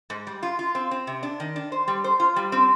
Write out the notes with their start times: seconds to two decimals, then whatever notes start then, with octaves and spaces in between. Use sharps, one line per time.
0.10 G#2
0.27 G3
0.43 F4
0.59 F4
0.75 C4
0.91 C4
1.07 C3
1.23 D4
1.40 D#3
1.56 D4
1.72 C5
1.88 G3
2.04 C5
2.20 F4
2.36 G3
2.52 C4